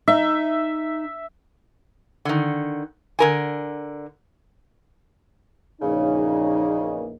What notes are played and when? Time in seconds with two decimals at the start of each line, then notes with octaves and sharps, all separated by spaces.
0.08 D#4 E5
2.25 D3 D#3
3.19 D3 A#4 G#5
5.82 A#1 E2 C#3 A#3 D#4